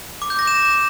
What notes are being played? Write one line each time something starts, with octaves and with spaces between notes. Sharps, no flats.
D6
G6
A#6
E7